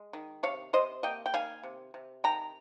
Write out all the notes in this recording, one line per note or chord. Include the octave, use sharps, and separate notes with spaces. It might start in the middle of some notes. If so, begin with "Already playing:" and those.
Already playing: G#3
D#3
C3 C#5 F5
C3 C5 D#5
A#3 D#5 G5
G5
D#3 F5 G#5
C3
C3
D#3 G5 A#5